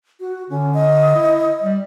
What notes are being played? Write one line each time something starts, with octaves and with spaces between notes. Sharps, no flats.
F#4
D3 C#4
D#5
E4
G3